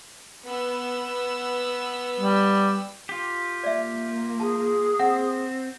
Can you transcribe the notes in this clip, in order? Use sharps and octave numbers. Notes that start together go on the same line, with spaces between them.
B3 E6
G3
F4 G4
A#3 D5 E5
G#4 A5
C4 F#5